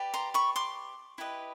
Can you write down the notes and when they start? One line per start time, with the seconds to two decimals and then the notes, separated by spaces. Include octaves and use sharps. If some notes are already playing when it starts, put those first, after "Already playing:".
Already playing: G4 B4 D5
0.14 A#5 C6
0.34 B5 C#6
0.56 C6 D6
1.18 E4 G4 B4 D#5